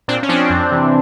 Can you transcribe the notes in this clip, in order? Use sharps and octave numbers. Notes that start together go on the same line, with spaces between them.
A#2 C4 D4
C#4
F3 C4 D4
F2
C3 E3